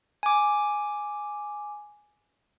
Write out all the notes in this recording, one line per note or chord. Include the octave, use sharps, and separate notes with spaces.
G#5 D6